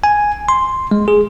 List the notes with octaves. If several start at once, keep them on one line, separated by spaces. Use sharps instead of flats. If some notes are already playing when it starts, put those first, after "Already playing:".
G#5
C6
G#3
G#4